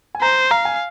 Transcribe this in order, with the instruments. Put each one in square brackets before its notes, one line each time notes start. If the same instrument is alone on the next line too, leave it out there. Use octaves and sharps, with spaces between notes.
[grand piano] G#5
[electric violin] C5 [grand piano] A#5
[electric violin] F5 [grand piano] A#5
[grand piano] G#5